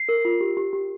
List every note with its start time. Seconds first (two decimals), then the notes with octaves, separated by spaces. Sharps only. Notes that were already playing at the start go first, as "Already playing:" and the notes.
Already playing: C7
0.09 A#4
0.25 F4
0.41 G4
0.57 G4
0.73 G4